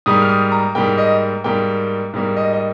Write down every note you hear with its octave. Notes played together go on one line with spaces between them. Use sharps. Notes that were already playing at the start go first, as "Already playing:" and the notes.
G#2 G3 A#3 D#6
F6
D#6
A#5
G#2 G3 A#3 G5
D#5
G#2 G3 A#3 G5
G#2 G3 A#3
D#5
D#5